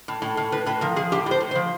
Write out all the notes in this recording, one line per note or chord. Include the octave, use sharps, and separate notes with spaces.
A2
A2
A2
A2 B4
A2 B4
F3 A#4
F3 G#4
A2 G4
A2 C5
A2
C5
F3